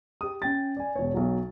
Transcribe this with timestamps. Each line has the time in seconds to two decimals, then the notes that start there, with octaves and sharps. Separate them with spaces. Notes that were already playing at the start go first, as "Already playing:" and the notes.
0.21 G4 D#6
0.42 C#4 G5 A6
0.77 D5 G#5
0.96 E1 C#5
1.14 B1 F#3